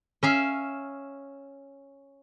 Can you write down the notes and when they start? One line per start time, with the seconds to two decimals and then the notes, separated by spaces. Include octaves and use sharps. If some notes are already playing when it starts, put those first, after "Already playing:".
0.23 C#4 E5 F5